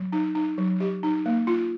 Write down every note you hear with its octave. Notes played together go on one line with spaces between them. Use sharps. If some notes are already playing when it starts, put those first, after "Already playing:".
Already playing: F#3
D#4
D#4
F#3
G4
D#4
A#3
F4